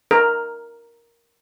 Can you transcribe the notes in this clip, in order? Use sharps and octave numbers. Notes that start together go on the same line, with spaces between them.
A#4